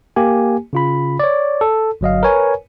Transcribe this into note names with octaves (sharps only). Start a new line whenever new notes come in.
A#3 G4 G#5
C#3 F4 B5
C#5 D5
A4
G1 F#3 D#5 F5
A#4 B4 C#5 G#5